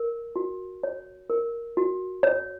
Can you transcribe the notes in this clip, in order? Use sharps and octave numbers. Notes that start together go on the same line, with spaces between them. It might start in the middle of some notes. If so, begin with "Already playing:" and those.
Already playing: A#4
F#4
C#5
A#4
F#4
C#5